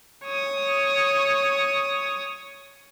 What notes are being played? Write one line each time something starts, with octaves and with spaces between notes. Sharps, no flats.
C#5 D#6